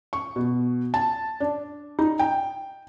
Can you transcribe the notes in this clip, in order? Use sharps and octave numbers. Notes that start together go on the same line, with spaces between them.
C#6
B2
A5
D4
D#4
G5